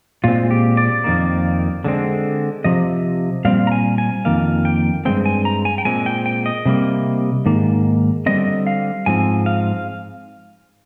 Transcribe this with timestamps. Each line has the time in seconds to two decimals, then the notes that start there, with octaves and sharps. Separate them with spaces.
0.24 A#2 G#3 C4 F4
0.51 G4
0.77 D5
1.04 F2 D#3 A#3
1.84 D3 G#3 C4
2.64 C3 F3 D#5
3.45 A#2 G3 C4 F5
3.67 A#5
3.72 G#5
3.98 G#5
4.25 F2 D#3 A#3 F5
4.65 G5
5.05 G2 F3 G#3 C4 G5
5.26 G#5
5.45 A#5
5.65 G#5
5.78 G5
5.85 A#2 G#3 C4 G#5
6.06 G5
6.26 G5
6.46 D#5
6.66 C3 G3 A#3
7.46 G#2 D#3 A#3
8.26 D3 G3 C4 D#5
8.67 F5
9.06 G#2 F3 C4 G#5
9.46 F5